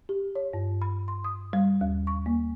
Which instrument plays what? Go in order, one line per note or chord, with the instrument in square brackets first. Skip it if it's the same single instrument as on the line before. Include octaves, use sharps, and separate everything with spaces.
[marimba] G4
C#5
G2
B5
C6
D#6
G3
D#2
C#6
A#3